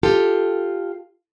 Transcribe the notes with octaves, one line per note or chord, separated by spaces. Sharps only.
F4 G4 A4